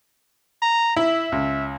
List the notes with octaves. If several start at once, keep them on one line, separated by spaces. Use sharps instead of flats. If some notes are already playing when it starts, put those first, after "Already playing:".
A#5
E4 E5
C#2